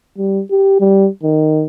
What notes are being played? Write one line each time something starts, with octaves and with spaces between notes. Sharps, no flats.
G3
G4
G3
D#3